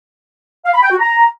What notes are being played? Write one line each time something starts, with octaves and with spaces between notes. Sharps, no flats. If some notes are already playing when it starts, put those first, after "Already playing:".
F5
B5
G5
F#4
A#5